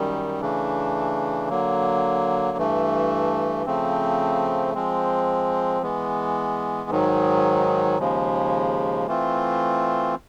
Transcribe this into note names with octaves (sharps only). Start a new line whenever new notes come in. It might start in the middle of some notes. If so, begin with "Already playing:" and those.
Already playing: F#2 D#3 G3
C#3 E3 A3 D4
D3 F#3 A#3
G2 E3 A3
C#3 F3 A3 C4
F3 G#3 C4
E3 G#3 B3
G#2 D#3 F#3
D#2 C#3 F3 G#3
E3 A3 C4 F4